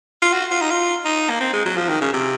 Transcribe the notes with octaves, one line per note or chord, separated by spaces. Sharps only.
F4
F#4
F4
D#4
F4
D#4
A#3
C4
G#3
F#3
F3
D#3
C#3
C3